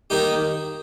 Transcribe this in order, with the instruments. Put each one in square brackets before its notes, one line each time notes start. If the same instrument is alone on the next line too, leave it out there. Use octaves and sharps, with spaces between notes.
[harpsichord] D#3 A#3 D#4 G4